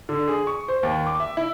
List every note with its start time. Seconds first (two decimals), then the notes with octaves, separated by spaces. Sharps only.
0.09 D3
0.28 G#4
0.47 C#6
0.68 C5
0.83 D#2
1.06 D6
1.20 E5
1.37 E4